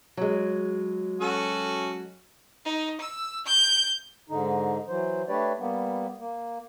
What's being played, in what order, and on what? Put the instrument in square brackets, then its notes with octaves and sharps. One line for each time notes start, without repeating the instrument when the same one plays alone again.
[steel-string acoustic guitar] F#3 G#3
[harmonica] C#4 F#4 A4
[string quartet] D#4
E6
G6
[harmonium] G#2 D3 D#4
E3 F#3 C5
A3 D4 G4 B4 C#5 D5
G3 A#3 B3
A#3